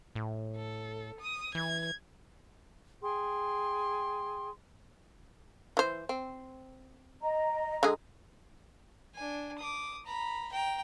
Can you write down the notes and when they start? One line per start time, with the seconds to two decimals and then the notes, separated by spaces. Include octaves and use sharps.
0.15 A2
0.56 A4
1.21 D#6
1.55 E3 G#6
3.02 G#4 G5 C6
5.77 E3 C5
6.09 C4
7.21 D#5 A#5
7.83 D3 G#3 G#4
9.15 D4 G#5
9.59 D6 D#6
10.06 A#5 B5
10.52 G5 A#5